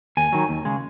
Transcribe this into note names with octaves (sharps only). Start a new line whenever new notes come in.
D#2 G#5
D#3 F#3
D#2
C#3 G#3